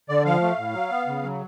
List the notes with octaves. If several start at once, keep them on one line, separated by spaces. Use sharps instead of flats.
D3 D5
F3 F5
A3
A2
F#3
B3
C#3
F#3